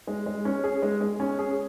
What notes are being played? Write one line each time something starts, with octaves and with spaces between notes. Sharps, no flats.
G#3
G#3
C#4
G#4
G#3
G#3
C#4
G#4